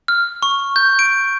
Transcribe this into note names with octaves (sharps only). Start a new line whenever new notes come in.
F6
C#6
G6
D7